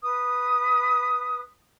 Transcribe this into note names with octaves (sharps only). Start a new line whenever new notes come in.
B4 D#6